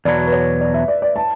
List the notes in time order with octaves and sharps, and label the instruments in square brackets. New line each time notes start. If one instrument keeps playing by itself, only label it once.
[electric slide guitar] E2 B2 F#3 [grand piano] D5
[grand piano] B4
C#5
D5
E5
D5
D5
A5